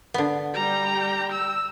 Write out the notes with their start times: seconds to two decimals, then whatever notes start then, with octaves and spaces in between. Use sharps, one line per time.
0.14 D3 B3
0.54 G3 G5 A#5
1.32 E6